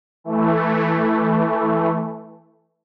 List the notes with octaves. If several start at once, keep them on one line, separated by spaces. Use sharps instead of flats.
E3 A3